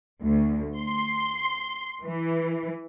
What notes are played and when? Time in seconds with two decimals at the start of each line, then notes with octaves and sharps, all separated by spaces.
0.22 D2
0.79 C6
2.04 E3